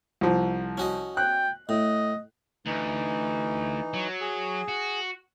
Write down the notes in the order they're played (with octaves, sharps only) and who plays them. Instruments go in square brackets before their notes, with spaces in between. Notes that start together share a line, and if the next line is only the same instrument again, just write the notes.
[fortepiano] C2 F3
[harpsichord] C#4 F#4 D#5
[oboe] G5 [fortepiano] F#6
[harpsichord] A2 [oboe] D#5
[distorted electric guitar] D2 [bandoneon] E3 D#4
[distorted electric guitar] F#3
[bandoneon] G#4
[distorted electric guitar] F#4